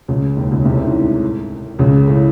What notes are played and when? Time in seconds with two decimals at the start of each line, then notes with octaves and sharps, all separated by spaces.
0.08 C#2 C#3
0.37 D#2 D#3
0.51 C#2 C#3
0.65 C2 C3
0.75 A2
0.85 G#2
1.79 C#2 C#3
2.07 A2